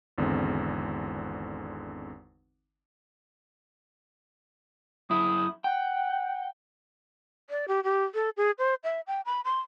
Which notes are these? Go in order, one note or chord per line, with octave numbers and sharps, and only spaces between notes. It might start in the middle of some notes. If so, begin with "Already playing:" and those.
G#1 E2 D3 G#3 C4
F#2 E4 D#6
F#5 G5
D5
G4
G4
A4
G#4
C5
E5
G5
B5
C6